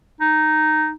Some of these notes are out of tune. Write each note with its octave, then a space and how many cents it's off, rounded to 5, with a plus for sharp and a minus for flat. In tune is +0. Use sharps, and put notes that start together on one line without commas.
D#4 -5